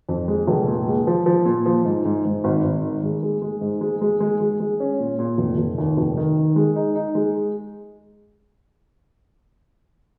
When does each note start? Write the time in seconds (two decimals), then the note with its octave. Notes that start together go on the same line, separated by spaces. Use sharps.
0.09 F2
0.28 G#3
0.48 F1
0.67 A#2
0.87 G#3
1.07 F3
1.26 F3
1.45 A#2
1.66 F3
1.85 G#2
2.05 G#2
2.25 G#2
2.44 G#1
2.64 G#1
2.83 D#3
3.03 G#3
3.23 G#3
3.42 G#3
3.61 G#2
3.81 G#3
4.01 G#3
4.20 G#3
4.41 G#3
4.60 G#3
4.80 C#4
4.99 A#2
5.19 A#2
5.38 F1
5.58 F1
5.78 D#2
5.97 F1
6.17 D#3
6.37 D#3
6.56 G#3
6.76 D#4
6.95 D#4
7.15 G#3